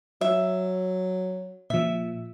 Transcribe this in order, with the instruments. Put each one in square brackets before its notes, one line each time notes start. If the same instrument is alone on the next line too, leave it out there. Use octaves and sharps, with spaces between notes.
[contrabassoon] F#3 [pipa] E5
[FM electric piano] A#2 F3 [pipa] E5